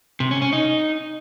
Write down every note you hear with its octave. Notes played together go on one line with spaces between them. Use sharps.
C3
C#4
C#4
D#4